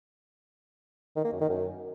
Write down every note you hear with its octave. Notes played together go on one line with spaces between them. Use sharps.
D#3
A#3
F#2
D#3
F#2